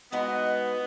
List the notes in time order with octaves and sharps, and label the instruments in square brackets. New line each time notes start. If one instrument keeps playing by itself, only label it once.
[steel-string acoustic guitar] G#3 D#4 F#4 D#5 [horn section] B3